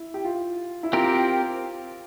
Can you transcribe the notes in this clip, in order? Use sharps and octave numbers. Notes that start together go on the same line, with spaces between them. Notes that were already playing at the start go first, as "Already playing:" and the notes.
Already playing: E4
G4
F4
E4
C4 F4 G4 A#4